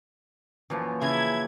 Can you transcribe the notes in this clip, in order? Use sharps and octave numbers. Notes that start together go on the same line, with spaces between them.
F#2 A#2 E3 F3
C#3 E4 G#5 A#5 G#6